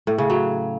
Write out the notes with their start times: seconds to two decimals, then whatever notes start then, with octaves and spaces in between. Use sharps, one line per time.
0.07 A2
0.18 C#3
0.30 F#3